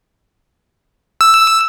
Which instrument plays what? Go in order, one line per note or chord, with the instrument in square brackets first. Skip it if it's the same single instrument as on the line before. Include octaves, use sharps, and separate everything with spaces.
[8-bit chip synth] E6